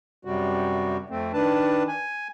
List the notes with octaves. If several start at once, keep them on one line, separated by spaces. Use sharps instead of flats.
F#2 C3 G3 F#4
F2 A3 C4
D#3 D4 B4 A5
G#5